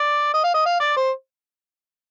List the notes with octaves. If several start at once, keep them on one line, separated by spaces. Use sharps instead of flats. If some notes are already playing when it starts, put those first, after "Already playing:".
Already playing: D5
D#5
F5
D#5
F5
D5
C5